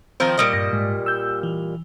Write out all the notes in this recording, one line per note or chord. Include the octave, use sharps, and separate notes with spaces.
D#3 F3 C4 C5
A#2 G3 D#5
G2 A#6
G#2
E6 G6
E3